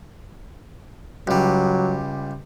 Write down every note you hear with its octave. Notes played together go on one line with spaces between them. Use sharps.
C#2 F#3 G3